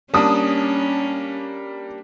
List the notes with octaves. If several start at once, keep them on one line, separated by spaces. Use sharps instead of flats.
G3 A#3 C#4 D4 A5 D#6